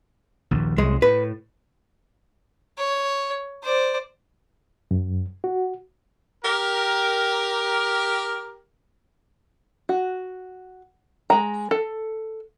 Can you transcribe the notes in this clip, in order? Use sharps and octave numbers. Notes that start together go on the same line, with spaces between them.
A#1 D#2
C2 F#3 G#3
A2 B4
C#5
C5 D5
F#2
F#4
G4 A#4
F#4
G#3 A#5
A4